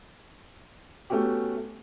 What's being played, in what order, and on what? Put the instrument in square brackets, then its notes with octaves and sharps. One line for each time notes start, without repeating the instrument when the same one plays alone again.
[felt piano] A3 B3 C#4 F#4 G4